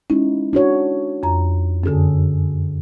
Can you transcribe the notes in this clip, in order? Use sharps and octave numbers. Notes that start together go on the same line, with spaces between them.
G#3 C#4 D#4 E4
D4 F#4 C#5
F2 A#5
F#2 D3 C#4 G#4 A4